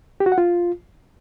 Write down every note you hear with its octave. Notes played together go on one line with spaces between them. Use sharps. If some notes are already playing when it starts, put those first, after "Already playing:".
G4
F#4
F#5
F4